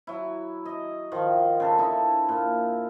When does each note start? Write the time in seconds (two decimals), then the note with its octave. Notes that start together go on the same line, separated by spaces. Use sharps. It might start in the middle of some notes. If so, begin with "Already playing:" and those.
0.07 F#3 E4
0.65 D#5
1.12 D#3 F3
1.60 C#3 A4
1.78 D3 D#4 E4
2.29 A#2